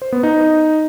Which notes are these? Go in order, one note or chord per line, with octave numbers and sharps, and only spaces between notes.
C5
B3
D#4